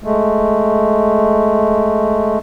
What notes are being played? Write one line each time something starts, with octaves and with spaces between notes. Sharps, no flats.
G#3 A3